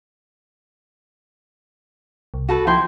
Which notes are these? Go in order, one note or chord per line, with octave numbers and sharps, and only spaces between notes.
C2
F#4 A4 B4
F3 E4 G5 C6